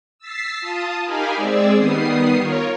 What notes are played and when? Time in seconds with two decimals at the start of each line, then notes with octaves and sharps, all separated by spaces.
0.19 E6 A6 B6 C7
0.61 F4 A5 D#6
1.03 D#4 G4 A#4 F5 G#5 B5
1.37 G#3 C4 G#4 D5 E6
1.75 D#3 G3 B3 D#6 C7
2.39 F4 A#4 C#5